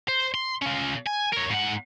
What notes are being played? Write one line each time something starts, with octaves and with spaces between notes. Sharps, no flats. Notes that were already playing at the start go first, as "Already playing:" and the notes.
C5
C6
C#4 F4
G#5
A#4 C#5
G#2 F#5